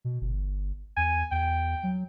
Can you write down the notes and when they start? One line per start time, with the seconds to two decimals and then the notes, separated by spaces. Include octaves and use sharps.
0.05 B2
0.21 G1
0.97 E2 G#5
1.31 E2 G5
1.83 F#3